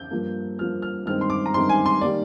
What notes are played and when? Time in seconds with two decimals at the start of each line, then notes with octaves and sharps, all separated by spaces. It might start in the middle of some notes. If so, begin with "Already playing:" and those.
Already playing: G6
0.11 G2 F3 A#3
0.59 G2 F3 A#3 F6
0.82 F6
1.06 G2 D#3 G#3 C4 F6
1.21 C6
1.30 D6
1.46 A#5
1.54 G2 D#3 G#3 C4 C6
1.69 G#5
1.86 C6
2.01 D#3 G3 A#3 D5